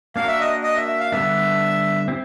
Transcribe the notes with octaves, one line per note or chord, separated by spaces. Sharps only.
A#3 D4 F#4 A#4 F5
E5
D#5
D#5
E5
E5
F5
D3 G3 B3 D4 E5
C4 E4